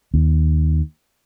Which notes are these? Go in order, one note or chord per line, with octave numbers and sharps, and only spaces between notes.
D#2